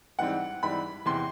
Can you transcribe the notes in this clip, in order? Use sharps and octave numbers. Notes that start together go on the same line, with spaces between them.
G#2 E3 G3 C4 F#5
G#2 E3 G3 C4 B5
E2 C3 E3 C6